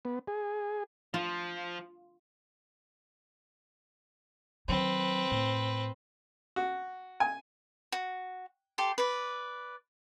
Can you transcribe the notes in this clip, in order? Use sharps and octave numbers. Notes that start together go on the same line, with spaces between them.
B3
G#4
F3 F4
D#3 F#3 C4 B4
A2
F#4
G#5
F#4
G4 A4 C6
B4 D5